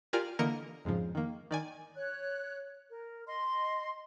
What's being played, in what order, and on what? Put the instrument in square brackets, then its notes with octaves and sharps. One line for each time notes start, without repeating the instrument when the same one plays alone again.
[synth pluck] F4 G4 A#4 D5 G#5 F6
D3 E3 A#3 A#4 D#5 C#7
F2 G#2 C#3 F3
D#3 A#3
D#3 D5 G#5
[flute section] C#5 F#6
A#4
D#5 C6